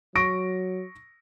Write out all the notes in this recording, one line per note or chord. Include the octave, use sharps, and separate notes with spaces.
F#3 C#6 A#6 D7